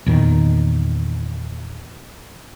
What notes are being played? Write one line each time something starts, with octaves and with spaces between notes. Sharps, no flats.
E2 A#2 D#3